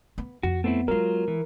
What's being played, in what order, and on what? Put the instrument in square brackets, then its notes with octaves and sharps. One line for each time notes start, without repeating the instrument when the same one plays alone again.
[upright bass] B3
[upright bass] F2 [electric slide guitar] F#4
[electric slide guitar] A3 C4 E4 [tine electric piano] B3
[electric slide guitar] F#3 F4 [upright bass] G#3 B3 [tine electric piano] A#4
[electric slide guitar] E3